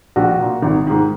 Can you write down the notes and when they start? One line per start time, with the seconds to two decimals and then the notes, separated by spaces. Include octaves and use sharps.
0.16 A#1 F#4
0.40 A#2
0.62 G#1
0.87 G#2 D#3